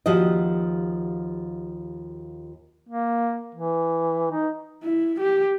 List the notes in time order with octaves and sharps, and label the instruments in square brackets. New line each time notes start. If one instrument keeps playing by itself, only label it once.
[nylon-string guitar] D#2 F3 F#4 G4 D#5
[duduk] A#3
E3
D#4
[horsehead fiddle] E4
G4